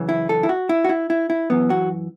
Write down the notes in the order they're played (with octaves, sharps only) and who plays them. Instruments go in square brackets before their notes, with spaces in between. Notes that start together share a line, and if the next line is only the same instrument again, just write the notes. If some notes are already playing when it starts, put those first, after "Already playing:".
Already playing: [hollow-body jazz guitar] F#2 C#3 E3
E4
A4
E4
F#4
E4
F#4
E4
E4
E4
F#2 E3 B3
F#4